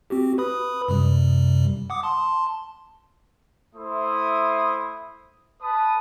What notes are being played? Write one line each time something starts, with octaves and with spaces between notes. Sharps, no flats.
C4 F#4 G4
B4 B5 D#6
F#2 C3 G3
F#5 D6 D#6
A5 C6
A3 E4 C5 D#6
B4 A5 D#6